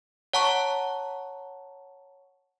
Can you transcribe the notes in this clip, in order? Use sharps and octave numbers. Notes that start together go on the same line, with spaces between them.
C#5 F#5 A5 A#5 C#6